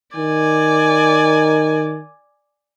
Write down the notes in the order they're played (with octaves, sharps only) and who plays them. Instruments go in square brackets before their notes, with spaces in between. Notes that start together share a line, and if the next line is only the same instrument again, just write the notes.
[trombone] D#3 [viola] D5 G#5